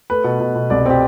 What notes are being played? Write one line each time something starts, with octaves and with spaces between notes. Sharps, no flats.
A3 B4
B2
B2
B2
C2 D5
C4 G4